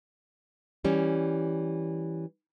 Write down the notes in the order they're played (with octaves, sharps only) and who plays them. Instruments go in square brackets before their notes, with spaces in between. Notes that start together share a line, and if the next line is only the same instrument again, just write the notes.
[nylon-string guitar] E3 G3 C#4